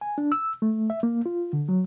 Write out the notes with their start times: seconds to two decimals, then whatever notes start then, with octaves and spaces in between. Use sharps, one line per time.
0.01 G#5
0.18 D4
0.32 E6
0.62 A3
0.90 E5
1.03 A#3
1.26 F4
1.53 D3
1.69 F#3